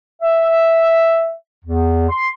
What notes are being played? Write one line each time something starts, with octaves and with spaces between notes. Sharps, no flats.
E5
E2
C6